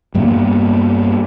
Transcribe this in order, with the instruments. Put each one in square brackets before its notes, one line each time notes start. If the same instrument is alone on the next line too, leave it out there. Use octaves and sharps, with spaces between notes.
[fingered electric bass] G2 G3 A#3 B3